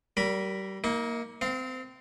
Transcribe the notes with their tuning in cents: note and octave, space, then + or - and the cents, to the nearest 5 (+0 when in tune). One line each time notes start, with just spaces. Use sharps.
G3 -30 A#4 +5 B5 +0
A#3 +0 D#4 +45
C4 -25 F5 +0